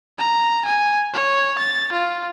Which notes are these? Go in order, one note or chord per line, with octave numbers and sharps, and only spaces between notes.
A#5
G#5
C#5
A6
F4